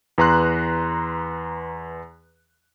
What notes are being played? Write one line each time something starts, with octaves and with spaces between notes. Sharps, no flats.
E2 B4 A#5 C6 F#6